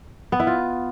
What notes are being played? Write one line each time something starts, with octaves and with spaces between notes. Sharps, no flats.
B3
E4
F4